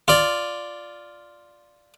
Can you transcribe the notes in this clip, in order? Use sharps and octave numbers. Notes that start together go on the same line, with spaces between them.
F4 D5